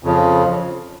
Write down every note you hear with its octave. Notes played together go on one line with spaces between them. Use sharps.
F2 C#3 F3